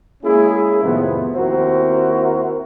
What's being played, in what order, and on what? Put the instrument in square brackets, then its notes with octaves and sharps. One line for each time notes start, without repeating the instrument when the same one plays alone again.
[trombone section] G#3 A#3 C#4 E4 G#4
F2 A2 C3 D#3 F3 B3
D#2 C4 E4 F#4 A#4 C5